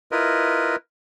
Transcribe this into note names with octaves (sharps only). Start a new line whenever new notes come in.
E4 F4 A#4 B4 D#5